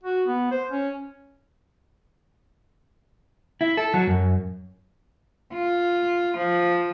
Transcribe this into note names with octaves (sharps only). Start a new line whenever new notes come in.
F#4
B3
C5
C#4
E4
A4
F#3
F#2
F4
F3